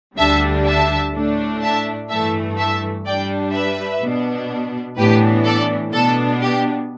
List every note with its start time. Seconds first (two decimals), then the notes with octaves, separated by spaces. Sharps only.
0.18 D2 D3 G3 D4 E5 A5
0.66 E5 A5
1.14 A2 A3 D4
1.62 E5 A5
2.10 G2 E3 A3 E5 A5
2.58 E5 A5
3.06 G2 G3 D4 D5 G5
3.53 B4 E5
4.01 B2 B3 D4
4.97 A2 E3 B3 D4 G4 B4
5.45 A4 D5
5.93 B2 B3 D4 A4
6.42 G4